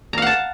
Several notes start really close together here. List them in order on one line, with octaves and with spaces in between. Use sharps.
A#5 F5 F#5 A5